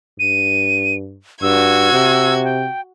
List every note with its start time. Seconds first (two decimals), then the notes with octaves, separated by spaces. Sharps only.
0.19 G2 D#7
1.42 G2 F#4 E6 G#6
1.92 C3
2.44 G5